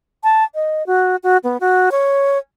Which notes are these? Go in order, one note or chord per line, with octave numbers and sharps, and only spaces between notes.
A5
D#5
F#4
F#4
B3
F#4
C#5